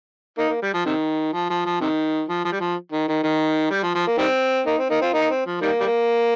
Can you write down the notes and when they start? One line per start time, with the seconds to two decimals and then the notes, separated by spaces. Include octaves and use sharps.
0.38 A#3 D#4
0.50 A#3
0.62 G3
0.74 F3
0.86 C3 D#3
1.33 F3
1.50 F3
1.66 F3
1.81 C3 D#3
2.29 F3
2.45 F3
2.53 G3
2.60 F3
2.92 D#3
3.08 D#3
3.23 D#3
3.71 G3
3.83 F3
3.95 F3
4.07 A#3
4.18 D#3 G3 C4
4.66 A#3 D#4
4.78 C4
4.90 A#3 D#4
5.01 C4 F4
5.13 A#3 D#4
5.30 C4
5.46 F3
5.62 D#3 G3 A#3
5.80 G3
5.86 A#3